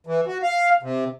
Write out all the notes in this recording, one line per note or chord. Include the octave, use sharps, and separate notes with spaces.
E3
F#4
F5
C3